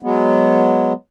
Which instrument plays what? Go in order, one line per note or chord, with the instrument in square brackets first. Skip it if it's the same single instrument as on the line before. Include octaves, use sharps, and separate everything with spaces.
[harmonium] F#3 G#3 B3